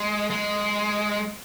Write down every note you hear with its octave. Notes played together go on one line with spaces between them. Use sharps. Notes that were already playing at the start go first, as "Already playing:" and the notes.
Already playing: G#3
G#3